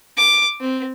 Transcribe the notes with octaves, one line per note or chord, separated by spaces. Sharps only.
D6
C4